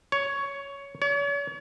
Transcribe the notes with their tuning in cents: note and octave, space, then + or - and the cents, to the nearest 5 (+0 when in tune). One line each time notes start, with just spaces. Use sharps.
C#5 +10
C#5 +40